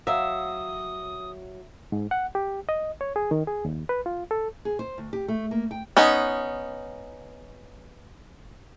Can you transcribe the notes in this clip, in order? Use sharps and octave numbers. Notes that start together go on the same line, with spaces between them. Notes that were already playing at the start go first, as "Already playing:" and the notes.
F#3 E5 F5 D#6
G#2
F#5
G4
D#5
C#5
G#4
D#3
G#4
D#2
B4
F4
A4
G#4
C5
D2
G4
A3
A#3
G5
B3 C#4 D#4